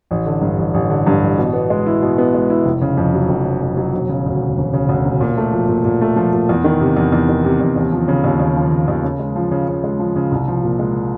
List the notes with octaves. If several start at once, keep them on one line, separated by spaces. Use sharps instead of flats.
A1
D3
G2
A1
A1
D3
G2
A1
B2
B3
G#3
E4
B2
B3
G#3
E4
F1
C#3
F2
F#3
F1
C#3
F2
F#3
E1
C#3
D2
E1
E1
C#3
D2
E1
A#2
A3
F3
A#2
A#2
A3
F3
A#2
E2
D#3
C3
E2
E2
D#3
C3
E2
D#2
F3
C#3
D#2
D#2
F3
C#3
D#2
C#3
G#3
F3
C#3
C#3
G#3
F3
C#3
C2
F3
A#2
G#3